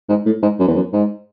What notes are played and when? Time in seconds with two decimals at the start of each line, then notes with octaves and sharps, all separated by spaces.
0.09 G#2
0.26 A2
0.42 G#2
0.59 F#2
0.68 E2
0.76 F#2
0.93 G#2